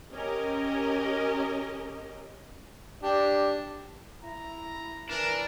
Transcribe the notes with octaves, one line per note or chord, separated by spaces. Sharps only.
C#4 G4 A#4 D#5
D4 G4
E4 A#5
E3 D4 A#4